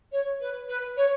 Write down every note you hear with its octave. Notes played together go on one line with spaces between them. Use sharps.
C#5
B4
B4
C#5